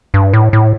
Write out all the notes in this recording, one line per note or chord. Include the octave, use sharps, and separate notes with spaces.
G2
A2
A2